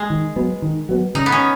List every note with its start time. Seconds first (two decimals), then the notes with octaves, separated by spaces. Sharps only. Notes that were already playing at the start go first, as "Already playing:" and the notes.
Already playing: G#3
0.10 D#3
0.36 F#3 B3
0.62 D#3
0.89 F#3 B3
1.15 C#3 D#4
1.26 B3
1.32 C#4